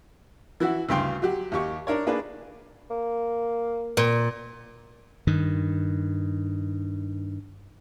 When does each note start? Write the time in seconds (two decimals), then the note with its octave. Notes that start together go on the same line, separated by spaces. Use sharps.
0.60 E3 E4 F#4
0.89 D2 G2 C#3 G5 C6
1.22 F#3 F#4 G4
1.52 D#2 G4 C#6
1.87 D4 A#4 C#5
2.07 A#3 D4 G#4 B4
2.90 A#3
3.97 A#2
5.27 G2 D#3